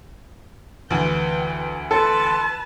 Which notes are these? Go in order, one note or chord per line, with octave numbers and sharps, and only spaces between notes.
D2 E3 B4 G5
A4 B4 A5 C6